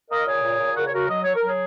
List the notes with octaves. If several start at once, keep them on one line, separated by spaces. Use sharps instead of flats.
A#3 A#4 D#5
A#2 G#4 C#5
A#2
A#2
C#3 F#4 A#4
C#5
C#3 F#4 A#4
F#3 D#5
F#3 C#5
A#4
F#3 G#4 C#5